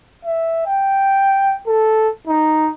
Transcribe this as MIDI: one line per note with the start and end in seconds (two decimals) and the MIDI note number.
0.25 0.63 76
0.67 1.57 79
1.67 2.09 69
2.27 2.71 63